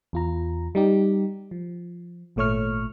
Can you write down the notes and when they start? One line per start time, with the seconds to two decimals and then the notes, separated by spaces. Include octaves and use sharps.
0.13 E2 F4 A#5
0.75 G3 D#4 G4
1.51 F3
2.36 G#1 A#2 A3 C#5 C#6 F6